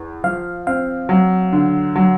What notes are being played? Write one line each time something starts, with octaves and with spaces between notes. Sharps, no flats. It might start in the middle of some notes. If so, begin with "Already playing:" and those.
Already playing: E2
F3 F5
C4 F5
F#3
D3
F#3